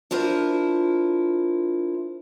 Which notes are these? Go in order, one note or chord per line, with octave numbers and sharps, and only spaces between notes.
D4 E4 F4 A#4 C5